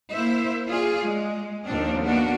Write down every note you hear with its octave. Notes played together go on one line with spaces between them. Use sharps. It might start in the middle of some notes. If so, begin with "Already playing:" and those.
A#3 E4 C5 E5
F4 G#4 D5
G#3
D#2 F3 A#3 C4 D4
A#3 B3 D4 F#4